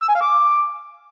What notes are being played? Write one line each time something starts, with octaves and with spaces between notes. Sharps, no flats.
E6
G#5
F5
D6